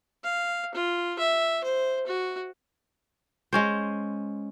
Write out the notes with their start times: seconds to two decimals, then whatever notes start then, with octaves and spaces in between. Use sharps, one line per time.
0.24 F5
0.75 F4
1.19 E5
1.64 C5
2.07 F#4
3.53 G#3 C#4 C5